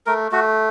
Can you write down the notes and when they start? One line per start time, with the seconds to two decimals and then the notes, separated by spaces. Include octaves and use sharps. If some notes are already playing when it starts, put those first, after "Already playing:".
0.06 A3 A#4
0.32 A3 F#4